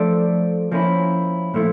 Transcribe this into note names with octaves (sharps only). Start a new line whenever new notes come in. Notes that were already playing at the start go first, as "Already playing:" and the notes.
Already playing: F3 A3 D4
F3 A#3 C#4 E4
A#2 F3 A3 E4